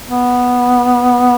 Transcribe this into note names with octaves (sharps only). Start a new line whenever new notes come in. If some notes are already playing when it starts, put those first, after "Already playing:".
B3